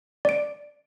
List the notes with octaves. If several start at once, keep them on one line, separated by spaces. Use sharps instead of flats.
D5 D7